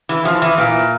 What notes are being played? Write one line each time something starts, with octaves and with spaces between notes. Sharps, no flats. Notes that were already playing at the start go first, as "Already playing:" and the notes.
E3
F3
E3
A#2